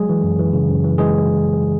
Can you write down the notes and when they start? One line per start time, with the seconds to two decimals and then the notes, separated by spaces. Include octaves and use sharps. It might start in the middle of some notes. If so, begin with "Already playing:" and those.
Already playing: F#3 G#3 G#4
0.09 E3
0.23 F#2
0.39 E3
0.53 C#3
0.68 F#2
0.84 E3
0.98 E3 G#3 G#4